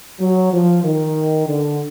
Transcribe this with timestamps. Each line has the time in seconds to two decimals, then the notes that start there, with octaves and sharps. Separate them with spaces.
0.20 F#3
0.53 F3
0.84 D#3
1.46 D3